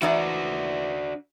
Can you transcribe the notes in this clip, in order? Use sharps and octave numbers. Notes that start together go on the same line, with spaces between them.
E3 D4 D#4 F#4 D5